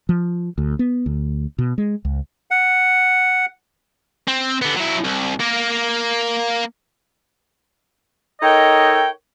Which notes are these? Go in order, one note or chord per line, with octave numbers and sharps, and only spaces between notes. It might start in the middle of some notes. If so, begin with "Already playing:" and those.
F3
D2
B3
D2
B2
G#3
C#2
F#5
C4
D3 B3
F#3 E4
C2
A#3 A#4
D#4 A4 A#4 C#5 D#5 G5